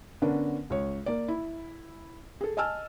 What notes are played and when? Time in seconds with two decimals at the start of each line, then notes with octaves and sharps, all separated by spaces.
0.22 D3 B3 C#4 D4 A#4
0.70 C#2 C#5
1.06 A#3 D5
1.28 E4
2.41 G#4 A4
2.57 D#5 G#5 A5 E6 F6